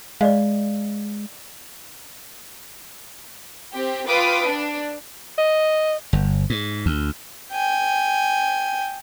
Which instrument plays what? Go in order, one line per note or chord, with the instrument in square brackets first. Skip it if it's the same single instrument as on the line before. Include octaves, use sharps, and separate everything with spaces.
[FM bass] G#3 [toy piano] D5 D#5 F5
[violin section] C4 G4
F4 B4 F5 G5 D6 D#6
D4
[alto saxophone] D#5
[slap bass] G1
G#2
D2
[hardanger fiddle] G5 G#5